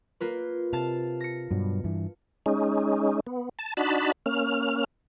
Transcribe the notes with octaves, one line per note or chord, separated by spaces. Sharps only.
A#3 F4 B4
C3 F5 A5 A6
A#6 C#7
G2 B2 F#3
G2 E3
G#3 C#4 D#4
B3
A5
D4 D#4 F#4 A5 B5
A#3 C#4 F6